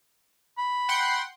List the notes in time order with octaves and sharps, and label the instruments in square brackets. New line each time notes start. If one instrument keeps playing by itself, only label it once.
[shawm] B5
[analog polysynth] F#5 G5 C6